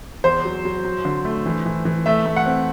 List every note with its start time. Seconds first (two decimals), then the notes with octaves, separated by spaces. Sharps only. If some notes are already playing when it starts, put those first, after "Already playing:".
0.24 E2 C5
0.45 F#3
0.65 F#3
0.85 F#3
1.05 D3
1.25 A3
1.46 E3
1.66 E3
1.85 E3
2.06 A3 E5
2.26 A3
2.36 F#5
2.46 C4